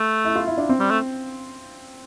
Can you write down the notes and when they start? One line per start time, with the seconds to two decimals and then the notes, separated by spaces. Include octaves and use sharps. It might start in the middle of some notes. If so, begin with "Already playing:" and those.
Already playing: A3
0.25 E4
0.35 F4
0.47 E4
0.58 D4
0.69 C4
0.80 G3
0.91 A3